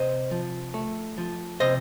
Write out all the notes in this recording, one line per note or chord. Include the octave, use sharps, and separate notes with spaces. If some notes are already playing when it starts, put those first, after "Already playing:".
Already playing: C3 C5 D#5
F3
A3
F3
C3 C5 D#5